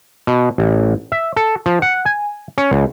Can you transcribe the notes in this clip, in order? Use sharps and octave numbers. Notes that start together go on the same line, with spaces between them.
B2
A1
E5
A4
F3
F#5
G#5
C#4
C#2